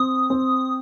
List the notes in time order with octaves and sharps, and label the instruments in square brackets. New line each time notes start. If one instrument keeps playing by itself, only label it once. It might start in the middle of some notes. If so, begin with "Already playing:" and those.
Already playing: [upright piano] C4 [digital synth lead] D#6
[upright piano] C4